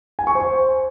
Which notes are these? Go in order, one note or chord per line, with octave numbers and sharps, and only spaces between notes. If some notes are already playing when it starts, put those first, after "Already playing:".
G#5
C#6
C5